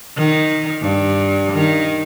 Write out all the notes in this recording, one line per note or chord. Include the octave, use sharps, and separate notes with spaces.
D#3
G2
D#3